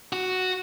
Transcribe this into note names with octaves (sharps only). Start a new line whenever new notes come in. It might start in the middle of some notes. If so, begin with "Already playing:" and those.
F#4